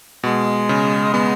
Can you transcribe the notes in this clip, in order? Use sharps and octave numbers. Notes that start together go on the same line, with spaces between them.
B2 G#3
C#3
G#3 B3